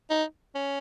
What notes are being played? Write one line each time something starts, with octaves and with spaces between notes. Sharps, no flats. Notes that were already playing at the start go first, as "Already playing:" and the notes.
D#4
C#4